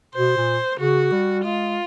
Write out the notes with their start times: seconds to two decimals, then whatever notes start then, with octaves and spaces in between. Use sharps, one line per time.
0.15 B2 C5
0.37 A#2
0.79 C#3 F#4
1.12 G3
1.44 G#3 F4